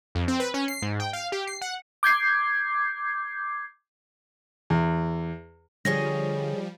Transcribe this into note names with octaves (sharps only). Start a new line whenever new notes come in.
F2
C4
B4
C#4
C7
G#2
G5
F5
G4
C7
F#5
D6 G6 G#6 C7
E2
D3 F3 G3 G#4 C#5 D#5 A#6